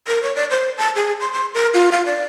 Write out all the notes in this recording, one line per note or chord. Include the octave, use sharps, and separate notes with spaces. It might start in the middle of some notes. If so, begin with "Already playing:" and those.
A#4
C#5
D5
C5
A5
G#4
C6
C6
A#4
F4
F5
D5